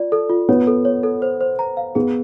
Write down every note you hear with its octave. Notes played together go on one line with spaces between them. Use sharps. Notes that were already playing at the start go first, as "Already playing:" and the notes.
Already playing: F4 D5
A4
F4
B3 C#5
A4
C#5
A4
C5
C5
A#5
F5
B3 G#4